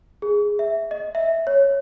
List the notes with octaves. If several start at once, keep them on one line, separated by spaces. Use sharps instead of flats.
G#4
E5
D#5
E5
C#5